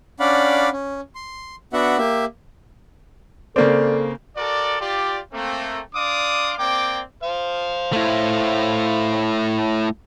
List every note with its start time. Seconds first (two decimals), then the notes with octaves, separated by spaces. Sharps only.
0.20 C#4 D4 D5 F5 F#5 B5
0.73 C#4
1.15 C6
1.73 B3 D4 F#4 E5 F#5
1.98 A#3 G4 E5
3.56 C#3 A#3 C4 A4 D5
4.37 F#4 A4 A#4 D5
4.81 F4 G4 D5
5.33 A3 A#3 C4
5.95 D4 D5 F5 C6 D6 D#6
6.58 A#3 C4 D5 G5 D6
7.23 C5 F5
7.93 A3 E4